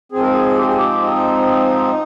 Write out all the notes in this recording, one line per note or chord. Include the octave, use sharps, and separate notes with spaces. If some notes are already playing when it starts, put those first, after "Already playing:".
G#2 F3 C4 G#4
A#4
G#4
G4
G#4
G4
D#4